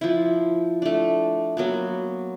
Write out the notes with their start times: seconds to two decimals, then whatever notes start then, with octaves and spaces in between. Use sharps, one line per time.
0.01 F3 E4
0.82 A3 D4
1.57 F#3 A#3 B3